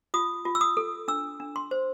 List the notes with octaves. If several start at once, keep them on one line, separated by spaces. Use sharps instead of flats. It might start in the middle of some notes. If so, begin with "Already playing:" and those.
F4 D#6
F4
E6
D#6
A4
D4 E6
D4
C6
C5